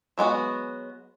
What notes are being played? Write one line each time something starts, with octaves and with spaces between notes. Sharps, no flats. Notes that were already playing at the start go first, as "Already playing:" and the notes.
F#3 G#3 B3 F#4